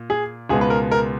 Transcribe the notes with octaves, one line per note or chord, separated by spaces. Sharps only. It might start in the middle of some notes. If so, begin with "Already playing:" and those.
Already playing: A#2
G#4
C#2 B2 G#3 B3 G#4
B4
A#4
A#4